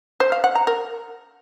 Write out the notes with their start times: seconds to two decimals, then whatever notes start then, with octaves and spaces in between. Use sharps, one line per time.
0.20 C5
0.32 F5
0.44 F#5
0.55 A#5
0.67 A#4